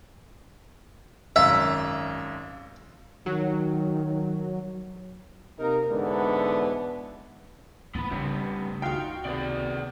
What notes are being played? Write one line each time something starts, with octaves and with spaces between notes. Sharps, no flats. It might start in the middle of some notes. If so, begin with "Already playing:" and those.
G#1 F#2 E5 F5
D#3 F#3
C3 A#3 D#4 A#4
G#2 B2 D3 E3 B3 D4
A2 E3 B3 B5
G2 C#3 A3 B3 C4 G4
C#2 D#4 F4 F#4 F5 G5
C3 D#3 B3 G#4 D5